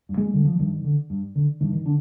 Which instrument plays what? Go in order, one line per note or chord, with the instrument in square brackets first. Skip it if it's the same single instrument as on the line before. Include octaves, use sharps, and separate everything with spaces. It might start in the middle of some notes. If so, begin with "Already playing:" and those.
[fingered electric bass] G2
G#3
D3 G3
F3
G2 D#3
D3
G2
D3
G2 D#3
D#3
D3 D4